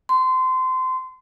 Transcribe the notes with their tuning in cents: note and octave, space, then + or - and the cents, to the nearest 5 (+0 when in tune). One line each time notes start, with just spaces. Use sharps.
C6 -25